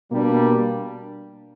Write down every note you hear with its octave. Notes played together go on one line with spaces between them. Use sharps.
B2 G3 A#3 D4